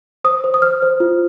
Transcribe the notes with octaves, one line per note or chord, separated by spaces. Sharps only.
C5 D#6
C5
D#6
C5 F6
C5
F4